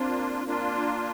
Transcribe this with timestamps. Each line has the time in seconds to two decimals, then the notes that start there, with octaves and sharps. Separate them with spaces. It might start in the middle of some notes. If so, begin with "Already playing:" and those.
Already playing: A#3 C4 D4 F4
0.45 A#3 D4 F4